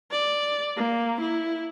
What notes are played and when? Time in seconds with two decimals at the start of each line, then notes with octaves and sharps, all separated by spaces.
0.12 D5
0.77 A#3
1.21 E4